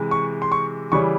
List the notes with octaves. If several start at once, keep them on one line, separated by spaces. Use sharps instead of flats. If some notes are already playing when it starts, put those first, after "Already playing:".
Already playing: C3 E3 G#3
C#6
C6
C#6
C#3 E3 G3 C#6